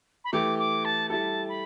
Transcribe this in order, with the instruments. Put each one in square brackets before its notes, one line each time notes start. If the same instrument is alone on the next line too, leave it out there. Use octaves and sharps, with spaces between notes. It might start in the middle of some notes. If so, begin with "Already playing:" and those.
[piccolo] B5
[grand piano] E3 A3 G4 [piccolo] D6
[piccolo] D6
A5
[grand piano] G3 E4 A4 [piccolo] A5
[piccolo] B5